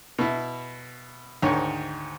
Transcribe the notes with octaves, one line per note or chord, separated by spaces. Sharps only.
B2 E4
D2 G#2 D#3 C#5